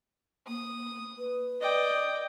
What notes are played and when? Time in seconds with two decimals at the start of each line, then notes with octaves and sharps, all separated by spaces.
0.48 A#3 D#6
1.18 B4
1.61 D5 D#5 G5